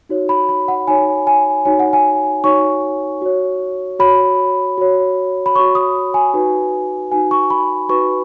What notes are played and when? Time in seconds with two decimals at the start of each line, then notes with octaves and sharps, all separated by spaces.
0.09 D#4 F#4 C#5
0.29 B5
0.49 B5
0.68 F#5
0.87 D#4 F#4 C#5 G#5
1.27 G#5
1.65 D#4 F#4 C#5 G#5
1.79 F#5
1.93 G#5
2.44 D#4 F#4 C#5 C#6
3.22 F#4 C#5
3.99 F#4 C#5 B5
4.78 F#4 C#5
5.46 B5
5.56 F#4 C#5 C#6
5.75 D#6
6.14 G#5
6.34 D#4 F#4 B4
7.11 D#4 F#4 B4 G#5
7.31 C#6
7.50 B5
7.89 D#4 F#4 B4 C#6